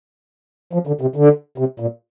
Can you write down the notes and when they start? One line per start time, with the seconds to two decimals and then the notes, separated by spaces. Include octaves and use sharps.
0.73 F3
0.87 D3
1.01 C3
1.16 D3
1.58 C3
1.80 A#2